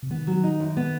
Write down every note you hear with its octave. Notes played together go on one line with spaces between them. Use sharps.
C3
D#3 B3
F#3
D#4
F#2
B3